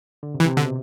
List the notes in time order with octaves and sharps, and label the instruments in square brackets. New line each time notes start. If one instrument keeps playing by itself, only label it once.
[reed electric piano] D3
C3
[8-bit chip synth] E3
[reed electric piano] C3
[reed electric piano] B2 [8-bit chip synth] D3